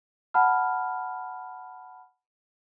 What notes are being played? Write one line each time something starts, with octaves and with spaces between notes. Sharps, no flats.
F#5 A5 B5 F6